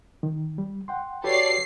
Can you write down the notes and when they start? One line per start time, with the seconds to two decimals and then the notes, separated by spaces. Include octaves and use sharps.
0.23 D#3
0.58 G3
0.88 F#5 G5 C6
1.24 F#4 G4 A4 B4 C#5 D5 C7